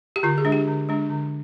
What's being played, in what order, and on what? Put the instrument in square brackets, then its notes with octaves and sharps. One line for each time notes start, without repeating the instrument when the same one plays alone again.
[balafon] G4
D3 F4
G#4
G#3 D4
G4
D3
G#3 D4
D3